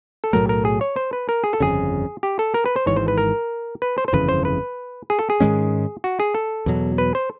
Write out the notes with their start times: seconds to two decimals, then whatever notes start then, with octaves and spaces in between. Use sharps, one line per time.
0.24 A4
0.33 B1 A2 F#3 A3 A#4
0.49 A#4
0.65 G#4
0.81 C#5
0.96 C5
1.13 B4
1.29 A#4
1.44 G#4
1.53 A4
1.60 G1 F2 C#3 G#4
2.23 G4
2.39 A4
2.54 A#4
2.66 B4
2.76 C5
2.87 G#1 G#2 E3 C#5
2.96 C5
3.08 B4
3.18 A#4
3.82 B4
3.98 C5
4.08 C5
4.13 G1 F2 C#3 E3 B4
4.29 C5
4.45 B4
5.10 G#4
5.19 A4
5.30 G#4
5.40 G#2 D#3 G#3 C#4
6.04 F#4
6.20 G#4
6.35 A4
6.66 E2 B2 F#3
6.98 B4
7.15 C5